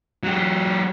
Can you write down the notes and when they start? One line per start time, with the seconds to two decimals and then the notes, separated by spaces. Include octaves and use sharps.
0.23 F#3 G4